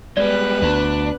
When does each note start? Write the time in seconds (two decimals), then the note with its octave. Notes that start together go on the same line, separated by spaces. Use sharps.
0.17 G3 G#3 B3 B4 D5 F#6
0.62 D2 D4